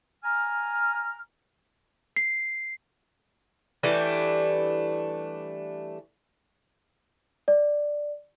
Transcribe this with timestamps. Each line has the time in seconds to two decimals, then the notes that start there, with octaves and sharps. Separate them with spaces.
0.24 G#5 A#5 F6
2.17 C7
3.83 E3 G3 A3 D4
7.48 D5